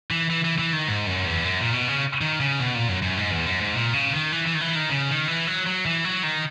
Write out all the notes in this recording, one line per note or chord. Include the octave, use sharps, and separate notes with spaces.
E3
E3
E3
E3
D#3
G#2
F#2
E2
F#2
A#2
B2
C#3
D#3
C#3
B2
A#2
F#2
F#2
G#2
E2
F#2
G#2
A#2
C#3
D#3
E3
E3
D#3
E3
D#3
C#3
D#3
E3
F#3
F#3
E3
F#3
D#3